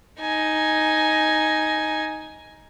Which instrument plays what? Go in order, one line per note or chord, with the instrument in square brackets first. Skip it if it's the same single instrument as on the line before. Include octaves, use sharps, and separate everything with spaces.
[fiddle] D#4 G#5